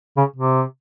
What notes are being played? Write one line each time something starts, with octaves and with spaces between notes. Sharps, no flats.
C#3
C3